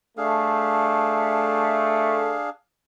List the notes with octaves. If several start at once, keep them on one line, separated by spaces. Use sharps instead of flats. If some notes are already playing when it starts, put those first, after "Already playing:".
A3 D4 G#4 F5